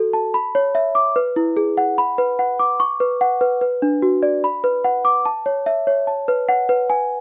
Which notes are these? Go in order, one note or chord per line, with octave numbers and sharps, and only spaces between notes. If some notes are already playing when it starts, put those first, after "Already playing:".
Already playing: F#4 A4
A5
B5
C#5
E5
D6
B4
E4
G#4
F#5
B5
B4
F#5
D6
C#6
B4
F#5
B4
B4
D4
F#4
D5
B5
B4
F#5
D6
A5
C#5
E5
C#5
A5
B4
F#5
B4
G#5